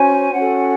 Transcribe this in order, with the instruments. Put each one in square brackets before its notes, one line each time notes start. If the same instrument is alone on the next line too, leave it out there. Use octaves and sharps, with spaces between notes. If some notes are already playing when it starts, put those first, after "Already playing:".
Already playing: [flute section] C#4 F#4 C5 G#5
C#4 F#4 A4 F#5